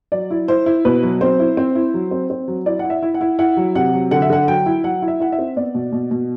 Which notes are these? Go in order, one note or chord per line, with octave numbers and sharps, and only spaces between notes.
F#3 D5
E4
E4 C5
E4
B2 B4
F#3
C4 C5
E4
C4
E4
F#3
C4
C4
F#3
E4 D5
E4 F#5
E5
E4
F#5
E4
E4 F#5
F#3
C3 F#5
F#3
D3 F#5
E5
D3 F#5
F#3 G5
E4
F#3 F#5
E4
E5
E4 F#5
E5
C4
B3 D5
B2
B2
B2